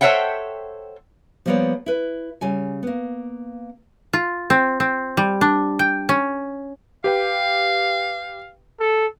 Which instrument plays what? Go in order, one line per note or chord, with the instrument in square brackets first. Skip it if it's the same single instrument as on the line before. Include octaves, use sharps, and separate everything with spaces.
[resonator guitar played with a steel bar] A4 C5 C#5 E5 F#5 G5
[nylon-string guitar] F3 G3 A#3 B3 C#5 D5
E4 B4
C#3 G3 G#5
A#3 B3
[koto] F4
C4
C4
G3
D4
G5
C#4
[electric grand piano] G4 B4 G5 [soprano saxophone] F5
[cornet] A4